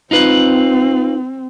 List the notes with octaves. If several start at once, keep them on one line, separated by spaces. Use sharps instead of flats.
C4 D#4 F4 B4